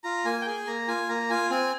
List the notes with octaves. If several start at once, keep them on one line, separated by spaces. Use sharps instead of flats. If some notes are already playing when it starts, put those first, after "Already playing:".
F4 A#5
A#3 G#5
G5
G#4 G#5
A#3 A#5
F4 G#5
A#3 A#5
F4 G#5
C4 G#5